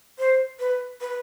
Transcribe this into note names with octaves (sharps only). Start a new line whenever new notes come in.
C5
B4
B4